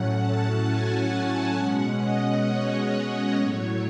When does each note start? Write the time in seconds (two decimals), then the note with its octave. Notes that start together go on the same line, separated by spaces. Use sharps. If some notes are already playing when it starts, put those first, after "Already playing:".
Already playing: A2 F#3 A3 C#4 F#5
0.18 A5
0.63 G#5
1.08 F#5
1.54 B2 G#3 C#4 F#5
2.00 D#5
2.45 C#5
2.91 D#5
3.36 A2 F#3 A3 C#5